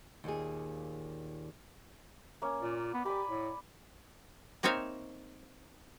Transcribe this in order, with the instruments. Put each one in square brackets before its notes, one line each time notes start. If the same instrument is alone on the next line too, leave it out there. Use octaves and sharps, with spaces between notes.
[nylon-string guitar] D#2 A#2 G#4
[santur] A#3 C#4
[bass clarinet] A#2 [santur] D5
[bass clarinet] B3
[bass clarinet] G4 [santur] D5 G#5 B5
[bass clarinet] A2
[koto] A#3 C4 D#4 C#5 E5 F5